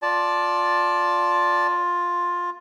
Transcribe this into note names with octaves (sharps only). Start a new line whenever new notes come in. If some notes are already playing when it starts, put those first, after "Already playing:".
F4 D5 A5